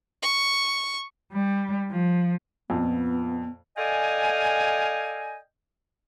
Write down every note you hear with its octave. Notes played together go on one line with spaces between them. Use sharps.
C#6
G3
F3
F2 A#2 B3
A4 D5 D#5 F5 G5 G#5